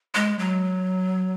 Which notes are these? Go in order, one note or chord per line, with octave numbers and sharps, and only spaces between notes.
G#3
F#3